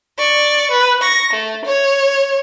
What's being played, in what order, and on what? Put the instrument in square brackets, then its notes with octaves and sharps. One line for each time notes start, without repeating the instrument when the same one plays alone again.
[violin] D5 C#6
B4
C#6 A#6
A3
C#5